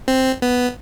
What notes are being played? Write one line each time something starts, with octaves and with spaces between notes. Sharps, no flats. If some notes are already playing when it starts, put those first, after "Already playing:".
C4
B3